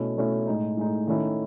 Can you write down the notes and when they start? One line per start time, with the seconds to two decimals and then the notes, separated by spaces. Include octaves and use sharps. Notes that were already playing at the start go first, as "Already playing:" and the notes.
Already playing: B2 A3 C#4 E4
0.17 B2 A3 C#4 E4
0.47 A2 G#3 D#4
0.77 A2 G#3 D#4
1.07 D#3 A3 C#4 E4